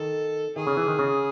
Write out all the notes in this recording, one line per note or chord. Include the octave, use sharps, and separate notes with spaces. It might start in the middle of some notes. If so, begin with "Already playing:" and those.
Already playing: D#3 A4
D#3 G#4
C#3
E3
D#3
C#3